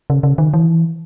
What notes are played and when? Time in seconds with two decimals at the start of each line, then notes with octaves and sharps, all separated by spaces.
0.10 C#3
0.23 C#3
0.38 D#3
0.54 E3